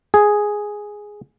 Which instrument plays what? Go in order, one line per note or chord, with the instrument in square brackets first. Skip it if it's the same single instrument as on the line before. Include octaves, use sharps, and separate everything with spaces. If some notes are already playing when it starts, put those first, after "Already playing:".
[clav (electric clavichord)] G#4